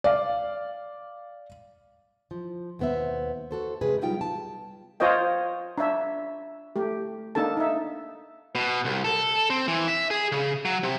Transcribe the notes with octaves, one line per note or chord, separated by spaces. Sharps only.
D5 F5
F3
D#2 B2 B3 C5 E5
F#4 A4 C5
C3 G#3 G#4 B4
B2 F#3 G3 D#4 F4 G5
A5
F4 C5 C#5 D#5 G5
D4 C#5 E5
A3 G4
A#3 D4 D#4 A4 A5
D#4 E5
B2
C2
A4
C4
E3
E5
G#4
C#3
F#3
C3